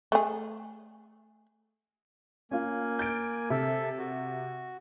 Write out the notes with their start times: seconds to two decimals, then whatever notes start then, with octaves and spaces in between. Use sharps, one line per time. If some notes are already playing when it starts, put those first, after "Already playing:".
0.12 A3 G#4
2.51 A#3 C#4 F4 G#5
2.99 G6 A6 D7
3.50 C3 A4 E5
3.99 F#4